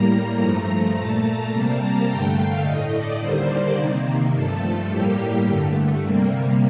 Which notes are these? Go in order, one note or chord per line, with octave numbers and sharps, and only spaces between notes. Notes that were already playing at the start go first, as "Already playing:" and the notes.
Already playing: A2 G3 A#3 A#5
G2 F3 A3
A#2 A3 A5
A#5
C3 G3 A#3 A5
A#5
G2 D3 A3 G5
F5
A2 A3 D#5
D5
D#2 D3 G3 A#3 C5
D5
C3 D#3 A#3
G2 F3 A3 A4
A2 G3 A#3 G4
G4
G2 D3 A3
C3 G3 A#3